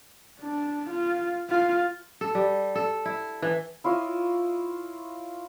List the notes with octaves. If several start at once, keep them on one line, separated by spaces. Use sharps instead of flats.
D4
F4
F4
A4
G3
A4
E4
E3
E4 F4 C#5 D#5